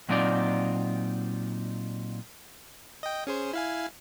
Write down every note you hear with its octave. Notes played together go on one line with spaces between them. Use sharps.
A#2 F#3 C4 D#4 F4 D5
D#5 G5
C#4 G#4 C5
E4 F5 G#5